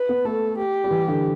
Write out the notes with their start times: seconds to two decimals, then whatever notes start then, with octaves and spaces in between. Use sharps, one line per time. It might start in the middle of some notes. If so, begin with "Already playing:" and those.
Already playing: B4
0.09 B3
0.25 A3 A4
0.58 G4
0.84 G3
0.91 E3
1.08 D3